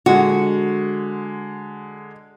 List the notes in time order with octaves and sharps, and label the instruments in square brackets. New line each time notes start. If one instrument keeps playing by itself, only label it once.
[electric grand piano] D3 G#3 [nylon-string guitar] F#4